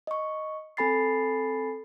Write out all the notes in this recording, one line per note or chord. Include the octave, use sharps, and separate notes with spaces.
D#5 C#6
C4 A4 G#5 B5 A6 C7